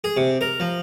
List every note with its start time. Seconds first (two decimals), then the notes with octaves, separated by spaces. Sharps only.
0.04 G#4
0.17 C3
0.41 A#4
0.60 F3